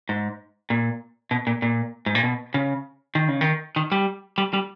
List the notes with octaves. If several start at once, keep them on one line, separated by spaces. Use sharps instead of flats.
G#2
A#2
B2
A#2
A#2
G#2
A#2
B2
C#3
D#3
C#3
D#3
D#3
G3
G3
G3